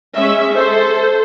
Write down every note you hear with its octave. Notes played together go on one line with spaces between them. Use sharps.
G#3 C#4 E5
A4 C5